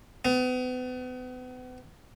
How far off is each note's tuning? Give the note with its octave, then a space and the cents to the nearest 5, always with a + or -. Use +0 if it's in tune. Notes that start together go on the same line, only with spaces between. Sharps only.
B3 +35